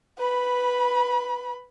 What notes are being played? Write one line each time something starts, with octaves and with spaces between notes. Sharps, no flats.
B4 B5